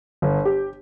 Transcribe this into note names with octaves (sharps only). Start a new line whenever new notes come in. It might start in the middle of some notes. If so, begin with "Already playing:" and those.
G1
G4